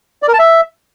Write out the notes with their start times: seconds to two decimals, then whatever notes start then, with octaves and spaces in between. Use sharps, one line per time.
0.22 D5
0.28 A#4
0.33 A5
0.39 E5